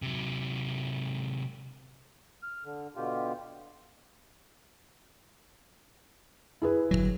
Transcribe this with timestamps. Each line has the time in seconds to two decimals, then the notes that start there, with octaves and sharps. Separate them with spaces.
0.02 C3 F#3
2.43 F6
2.65 D3
2.96 B2 D3 F4 G4
6.62 E4 G#4 B4
6.91 G1 D#2 F#3